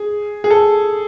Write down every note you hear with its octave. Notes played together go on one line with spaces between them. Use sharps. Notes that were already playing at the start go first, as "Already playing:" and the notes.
Already playing: G#4
G#4
A4